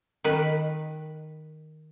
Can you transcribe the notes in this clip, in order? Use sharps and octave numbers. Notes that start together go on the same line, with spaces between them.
D#3 B4